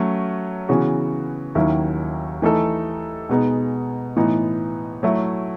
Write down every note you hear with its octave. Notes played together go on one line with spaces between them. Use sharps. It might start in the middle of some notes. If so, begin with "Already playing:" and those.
Already playing: F#3 A3 C#4
C#3 E3 B3 F#4
D#2 D#3 F#3 C#4 E4
E3 A3 D#4 A4
B2 G#3 B3 D#4
A2 E3 B3 D#4
F#3 A3 E4